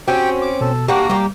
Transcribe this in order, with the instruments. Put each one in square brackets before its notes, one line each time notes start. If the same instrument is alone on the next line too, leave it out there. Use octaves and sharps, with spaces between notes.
[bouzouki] C4 C#4 [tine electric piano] F#4 [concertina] G4 G5
[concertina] D6
[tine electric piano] B2 [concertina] A4
[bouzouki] G3 A#3 D4 [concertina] F#4 A#5 [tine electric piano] G4 F#5 G5
[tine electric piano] G3 [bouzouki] A#3 G4